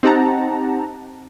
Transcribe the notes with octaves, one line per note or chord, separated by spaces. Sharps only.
C4 D#4 G4 F#5 A5 A#5